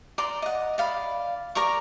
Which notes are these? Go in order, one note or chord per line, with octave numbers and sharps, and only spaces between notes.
D5 A#5 C6
D#5 F#5
D5 F5 B5
A#4 D5 A#5 C#6